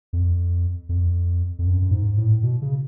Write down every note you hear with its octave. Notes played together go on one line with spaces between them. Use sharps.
F2
F2
F2
F#2
F#2
G#2
A2
B2
C#3